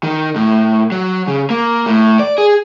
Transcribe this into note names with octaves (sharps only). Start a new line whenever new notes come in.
D#3
A2
F#3
C#3
A#3
A2
D5
G#4